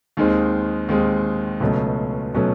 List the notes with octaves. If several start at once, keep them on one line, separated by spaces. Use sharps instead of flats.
D#2 D#3 G#3 C4
D#2 D#3 G#3 C4
C#2 B2 F#3 A3 C#4
B2 F#3 A3 C#4